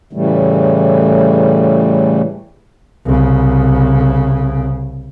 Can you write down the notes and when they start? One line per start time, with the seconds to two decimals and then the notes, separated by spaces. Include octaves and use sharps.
0.13 A2 C#3 E3 G3 A3
3.05 C2 C#3